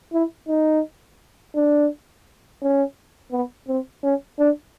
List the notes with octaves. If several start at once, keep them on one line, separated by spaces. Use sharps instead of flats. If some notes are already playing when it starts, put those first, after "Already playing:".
E4
D#4
D4
C#4
B3
C4
C#4
D4